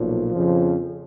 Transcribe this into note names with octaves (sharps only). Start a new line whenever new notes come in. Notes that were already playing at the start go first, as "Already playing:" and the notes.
Already playing: B1 A#2 F3
F2 C#3 F3